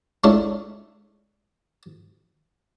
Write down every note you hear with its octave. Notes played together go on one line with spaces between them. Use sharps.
G#3 A3 C#4 D4 E4 F4